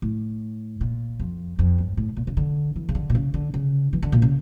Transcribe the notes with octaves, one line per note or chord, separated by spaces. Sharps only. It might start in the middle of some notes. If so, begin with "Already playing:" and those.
A2
A#2
F2
F2
G2
A2
A#2
C#3
D3
E3
C#3
D3
A#2
C#3
D3
C#3
E3
D3
A#2
C#3